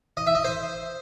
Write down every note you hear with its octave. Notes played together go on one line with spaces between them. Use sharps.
D#5
E5
D#5
C5